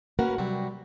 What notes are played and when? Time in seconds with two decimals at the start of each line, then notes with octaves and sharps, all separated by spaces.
0.19 A#3 C#4 F#4 A#4 B4 F#5
0.38 C3 F#3 G3 F#4